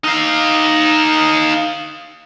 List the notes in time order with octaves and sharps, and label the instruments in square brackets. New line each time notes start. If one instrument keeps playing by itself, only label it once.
[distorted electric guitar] D#4 F5